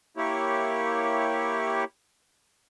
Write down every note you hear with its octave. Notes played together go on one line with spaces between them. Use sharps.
A#3 E4 G4 C#5